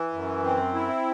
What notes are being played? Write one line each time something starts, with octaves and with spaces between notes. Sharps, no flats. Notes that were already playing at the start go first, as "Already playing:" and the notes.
Already playing: E3
F#2
C4
E4